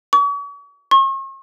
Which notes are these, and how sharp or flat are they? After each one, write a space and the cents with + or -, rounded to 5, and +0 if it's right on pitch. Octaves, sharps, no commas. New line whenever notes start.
C#6 +45
C#6 -45